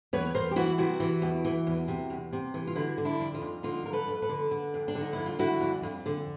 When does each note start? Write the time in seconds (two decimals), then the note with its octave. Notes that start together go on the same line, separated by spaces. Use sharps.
0.13 E2 B4 C#5
0.35 E2 A#4 C5
0.51 G4
0.56 E3 E4 F#4
0.78 C3 E4 F#4
1.00 E3
1.22 E2
1.44 E3
1.67 E2
1.88 C3
2.10 E2
2.32 C3
2.54 E3
2.67 F4
2.75 D3 E4 F#4
2.98 D3
3.05 D4 E4
3.19 F2
3.34 D#4 F4
3.42 F2
3.63 D3 D#4 F4
3.85 F2 A#4
3.93 A4 B4
4.08 F2
4.22 A4 B4
4.29 D3
4.51 D3
4.74 F2
4.88 D4
4.95 D3
5.01 D#4
5.13 F2 E4
5.26 F4
5.39 D3 E4 F#4
5.61 F2
5.83 F2
6.06 D3